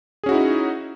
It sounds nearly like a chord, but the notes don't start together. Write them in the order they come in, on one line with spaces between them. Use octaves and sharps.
G#4 C#4 F#4 E4 D#4